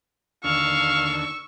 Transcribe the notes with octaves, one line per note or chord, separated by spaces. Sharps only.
D#2 D3 F5 C#6 E6